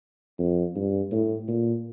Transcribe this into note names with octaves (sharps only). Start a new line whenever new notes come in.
F2
G2
A2
A#2